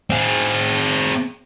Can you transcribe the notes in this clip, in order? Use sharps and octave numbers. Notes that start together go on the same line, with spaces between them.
C4 G#4